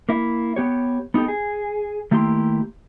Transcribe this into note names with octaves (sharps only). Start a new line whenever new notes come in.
A#3 E4
B3 G4 C#5
B3 D#4 F#4 G4 A4
G#4
D#3 A3 A#3 E4 G4 C6